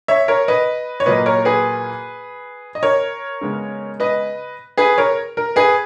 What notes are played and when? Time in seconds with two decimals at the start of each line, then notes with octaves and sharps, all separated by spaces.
0.08 C#5 E5
0.28 A#4 C#5
0.48 B4 D#5
1.00 C#5
1.06 A#2 F#3 A#3 B4 D#5
1.26 A#4 C#5
1.45 G#4 B4
2.75 D#5
2.83 A#4 C#5
3.41 C#3 G#3 B3
4.00 B4 D#5
4.77 G#4 B4
4.98 A#4 C#5
5.37 A#4
5.56 G#4 B4